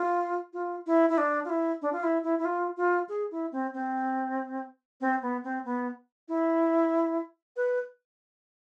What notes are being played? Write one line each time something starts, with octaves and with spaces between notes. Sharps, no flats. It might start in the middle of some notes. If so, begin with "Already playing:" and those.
Already playing: F4
F4
E4
E4
D4
F4
E4
D4
F4
E4
E4
E4
F4
F4
G#4
E4
C4
C4
C4
B3
C4
B3
E4
B4